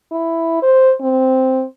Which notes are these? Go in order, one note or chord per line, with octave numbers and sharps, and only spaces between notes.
E4
C5
C4